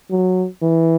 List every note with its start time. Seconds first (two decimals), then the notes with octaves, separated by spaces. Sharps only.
0.11 F#3
0.62 E3